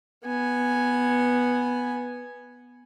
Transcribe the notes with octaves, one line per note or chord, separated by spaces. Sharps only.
B3 G#5